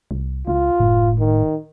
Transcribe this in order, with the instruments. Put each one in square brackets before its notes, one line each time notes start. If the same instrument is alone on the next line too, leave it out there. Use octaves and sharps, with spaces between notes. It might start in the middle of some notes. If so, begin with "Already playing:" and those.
[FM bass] C2
[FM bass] C#2 [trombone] F4
[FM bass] F#1 [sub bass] A2
[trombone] D#3